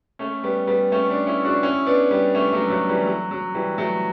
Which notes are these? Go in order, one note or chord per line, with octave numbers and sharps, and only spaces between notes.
A3 C#4
G3 B3
G3 B3
A3 C#4
B3 D4
C#4 E4
D4 F#4
C#4 E4
B3 D4
G3 B3
A3 C#4
F#3 A3
F#3 A3
E3 G3
F#3
F#3
E3 G3
F#3 A3